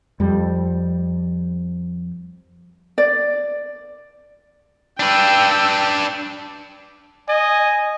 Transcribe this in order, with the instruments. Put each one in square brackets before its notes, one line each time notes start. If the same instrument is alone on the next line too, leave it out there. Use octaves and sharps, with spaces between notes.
[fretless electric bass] F2 G3
[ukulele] D5
[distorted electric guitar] D4 B4 [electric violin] G5 E6
[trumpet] D#5 [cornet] G#5